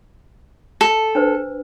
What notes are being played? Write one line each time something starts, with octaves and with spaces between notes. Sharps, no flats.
A4
D4 B4 C5